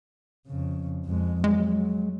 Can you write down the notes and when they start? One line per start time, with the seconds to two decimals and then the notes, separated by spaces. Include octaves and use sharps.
0.48 F2 C#3
1.05 F2 G#3
1.44 F#3 G#3